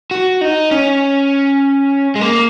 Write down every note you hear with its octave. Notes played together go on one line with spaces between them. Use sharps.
F#4
D#4
C#4
G#3
A#3